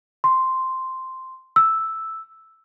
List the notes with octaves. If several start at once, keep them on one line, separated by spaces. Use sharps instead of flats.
C6
E6